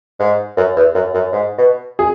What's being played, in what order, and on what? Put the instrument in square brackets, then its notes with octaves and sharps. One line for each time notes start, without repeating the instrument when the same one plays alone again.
[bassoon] G#2
F#2
E2
F#2
F#2
G#2
B2
[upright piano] G#4